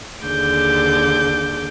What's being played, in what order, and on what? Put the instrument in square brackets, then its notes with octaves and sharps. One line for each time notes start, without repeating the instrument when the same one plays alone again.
[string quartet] D#2 D3 G#4 D6 G6